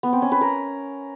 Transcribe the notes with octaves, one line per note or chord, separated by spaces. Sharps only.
B3
C4
C#4
B4
A#4